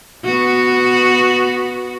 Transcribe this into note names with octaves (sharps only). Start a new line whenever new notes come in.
B3 F#4